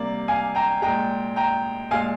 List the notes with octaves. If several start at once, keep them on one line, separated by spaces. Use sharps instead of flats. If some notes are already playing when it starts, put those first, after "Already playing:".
Already playing: C3 G3 A#3 D5
F5 G#5
G5 A#5
A#2 G#3 G5 A#5
G5 A#5
A#2 G#3 F5 G#5